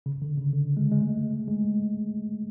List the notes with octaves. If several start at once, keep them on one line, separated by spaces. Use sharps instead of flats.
C#3
D3
C#3
D3
G#3
G#3
A3
G#3